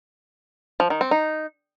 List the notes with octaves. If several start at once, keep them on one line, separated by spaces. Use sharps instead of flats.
F3
D#3
C4
D#4